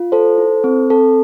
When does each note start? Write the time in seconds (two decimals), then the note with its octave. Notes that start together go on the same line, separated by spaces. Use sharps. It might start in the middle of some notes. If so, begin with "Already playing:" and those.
Already playing: F4
0.12 A4 C5
0.38 E4
0.64 C4
0.90 C4 A4